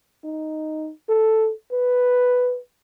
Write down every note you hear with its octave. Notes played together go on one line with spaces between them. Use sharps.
D#4
A4
B4